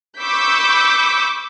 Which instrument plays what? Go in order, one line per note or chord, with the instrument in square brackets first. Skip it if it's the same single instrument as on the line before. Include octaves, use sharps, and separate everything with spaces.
[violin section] B5 C#6 D6 E6 G6 B6